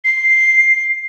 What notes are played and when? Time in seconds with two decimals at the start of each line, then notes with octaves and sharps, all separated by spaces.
0.04 C7